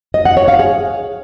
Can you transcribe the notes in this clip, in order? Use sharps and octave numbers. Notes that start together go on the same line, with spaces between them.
D#5
F#5
C#5
F5
G#4